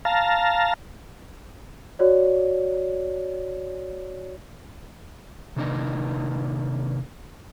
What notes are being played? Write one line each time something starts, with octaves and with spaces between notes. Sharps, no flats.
F5 A5 A#5
F#4 C#5 D5
C3 D#3 A#3 D4 D#4 D#5